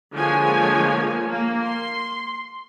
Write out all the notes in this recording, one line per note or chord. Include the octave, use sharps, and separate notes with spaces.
D3 F3 G#3 A#3 C#5 G#5
A#3
C6